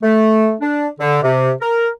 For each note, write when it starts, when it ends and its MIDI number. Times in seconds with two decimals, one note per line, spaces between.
0.02 0.53 57
0.60 0.87 62
1.00 1.21 50
1.22 1.51 48
1.61 1.87 70